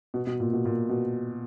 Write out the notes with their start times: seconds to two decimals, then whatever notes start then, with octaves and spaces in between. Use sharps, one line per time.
0.14 B2
0.27 B2
0.40 A#2
0.53 B2
0.65 A#2
0.89 B2